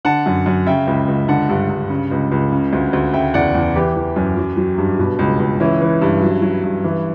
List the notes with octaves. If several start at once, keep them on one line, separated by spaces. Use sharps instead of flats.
D3 F#5 A5
F#2
F#2
C#3 E5 G5
C#2
C#2
D3 F#5 A5
G2
G2
C#3
C#2
C#2
C#3
D2
D2
C#3 E5 G5
E2 D5 F#5
E2
E3 G4 B4
E3
F#2
F#3
F#3
G2
B2
C#2
C#2
E3 C#4 E4
E3
G2
F#3
F#3
G2
E3